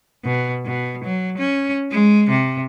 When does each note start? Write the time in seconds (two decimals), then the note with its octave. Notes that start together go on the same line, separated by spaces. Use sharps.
0.24 B2
0.65 B2
1.04 F#3
1.38 C#4
1.91 G#3
2.29 C3